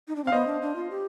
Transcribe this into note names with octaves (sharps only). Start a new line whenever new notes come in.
D#4
D4
C4 F5
B3 C5 D#5
D4
D4
F4
G4